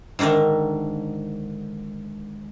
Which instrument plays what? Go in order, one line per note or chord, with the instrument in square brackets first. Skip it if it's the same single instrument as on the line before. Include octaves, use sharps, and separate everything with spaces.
[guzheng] G#2 D3 D#3 D4 E5